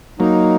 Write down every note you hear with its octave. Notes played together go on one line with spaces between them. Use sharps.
F#3 A#3 D#4